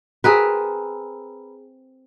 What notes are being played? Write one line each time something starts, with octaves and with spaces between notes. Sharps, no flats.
C4 G#4 A#4 B4